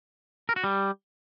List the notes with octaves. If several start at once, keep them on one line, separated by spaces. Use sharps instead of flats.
A#4
F#4
G3